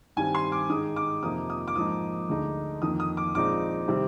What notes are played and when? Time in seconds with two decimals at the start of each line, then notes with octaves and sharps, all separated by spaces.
0.17 G2 D#3 G3 C4 G#5
0.35 C6
0.52 D6
0.69 G#2 D#3 G#3 D#4 D#6
0.96 D6
1.23 F2 C3 F3 A#3 D#4 D#6
1.50 D#6
1.68 D6
1.76 G#2 F3 A#3 D#4 D#6
2.29 D2 D3 G#3 D#4
2.82 F2 D#3 A#3 D#4 D#6
3.00 D#6
3.17 D6
3.35 A#1 A#2 G#3 C4 D#4 D6
3.88 C3 D#3 G3 C4